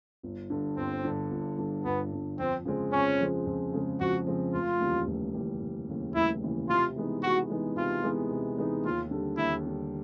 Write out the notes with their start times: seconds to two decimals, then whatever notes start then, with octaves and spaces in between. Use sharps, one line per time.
0.23 G1
0.50 G2 D3
0.77 G1 C4
1.05 G2 D3
1.31 G1
1.58 G2 D3
1.84 G1 B3
2.12 G2 D3
2.39 F2 C4
2.65 C#3 F3 G#3 C4
2.92 F2 C#4
3.19 C#3 F3 G#3 C4
3.46 F2
3.73 C#3 F3 G#3 C4
4.00 F2 F#4
4.27 C#3 F3 G#3 C4
4.54 F1 F4
4.80 D#2 C#3 E3 G3
5.07 F1
5.35 D#2 C#3 E3 G3
5.61 F1
5.88 D#2 C#3 E3 G3
6.15 F1 E4
6.42 D#2 C#3 E3 G3
6.69 C3 F4
6.96 E3 G#3 B3 D#4
7.23 C3 F#4
7.50 E3 G#3 B3 D#4
7.76 C3 F4
8.03 E3 G#3 B3 D#4
8.30 C3
8.57 E3 G#3 B3 D#4
8.84 D#2 F4
9.11 D3 G3
9.38 D#2 E4
9.65 D3 G3